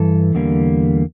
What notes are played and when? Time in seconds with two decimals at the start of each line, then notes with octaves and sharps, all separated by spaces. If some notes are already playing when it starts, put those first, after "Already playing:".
Already playing: G2 E3 A4
0.35 E2 D3 G3 A#3